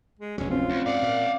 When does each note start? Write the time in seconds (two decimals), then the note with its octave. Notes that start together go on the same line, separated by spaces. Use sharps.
0.19 G#3
0.38 F1 D2 F#3 C#4
0.50 C4 C#4 F4
0.70 D2
0.86 G#2 D5 F5 F#5
1.02 A#2